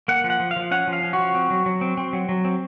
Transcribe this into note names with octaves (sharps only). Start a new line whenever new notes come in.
A#3 F#5
F3
F#5
F3
F5
F3
C#4 F#5
F3
F5
C#4
F#4
F3
C4
F#3
F#3
C4
C4
F#3
F#3
C4